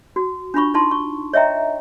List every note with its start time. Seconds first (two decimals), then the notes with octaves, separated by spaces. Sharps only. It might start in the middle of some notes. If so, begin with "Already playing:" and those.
0.16 F#4
0.54 D4 F4 B5 C#6
0.74 D#4 F4 A5 C6
0.91 C#6
1.33 C#5 D#5 E5 G5 A#5